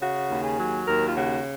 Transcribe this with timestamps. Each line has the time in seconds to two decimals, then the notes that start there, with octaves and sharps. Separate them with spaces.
0.01 C#3 F#4
0.29 D#2
0.43 G#4
0.59 F#3
0.87 D#2 A#4
1.09 F4
1.16 C#3 F#4